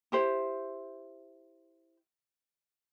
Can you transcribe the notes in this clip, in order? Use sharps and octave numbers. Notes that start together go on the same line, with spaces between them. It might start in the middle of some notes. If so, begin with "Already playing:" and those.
E4 G4 C5